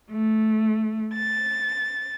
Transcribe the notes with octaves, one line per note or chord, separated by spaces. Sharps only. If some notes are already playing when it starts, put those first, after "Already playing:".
A3
A6